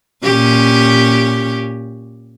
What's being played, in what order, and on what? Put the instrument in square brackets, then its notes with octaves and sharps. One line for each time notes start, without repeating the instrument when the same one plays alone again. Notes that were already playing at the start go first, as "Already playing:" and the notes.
[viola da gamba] A#2 C#4 G4